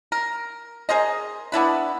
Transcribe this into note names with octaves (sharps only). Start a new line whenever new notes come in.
A#4
G#4 A#4 C5 D#5
B3 D4 E4 B4